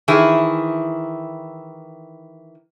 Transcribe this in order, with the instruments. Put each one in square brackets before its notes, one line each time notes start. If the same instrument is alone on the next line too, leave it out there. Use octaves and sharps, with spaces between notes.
[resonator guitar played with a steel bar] D#3 E3 E4 G#4